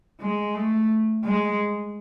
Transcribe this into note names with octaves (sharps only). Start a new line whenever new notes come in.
G#3
A3
G#3